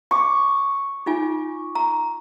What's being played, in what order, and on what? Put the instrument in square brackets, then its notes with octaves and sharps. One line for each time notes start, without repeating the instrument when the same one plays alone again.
[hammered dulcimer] C#6 D6
[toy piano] D#4 F4 G#5
A#5